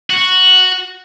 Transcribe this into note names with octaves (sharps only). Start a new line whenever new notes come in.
F#4